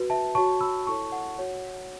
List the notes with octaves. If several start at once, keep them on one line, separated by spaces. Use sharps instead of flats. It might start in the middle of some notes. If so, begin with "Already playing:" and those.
Already playing: F#4 B4
E5 A5
F#4 C#5 A5 C#6
B5 E6
E4 A4 C#5 A5 C#6
F#5
F#4 C#5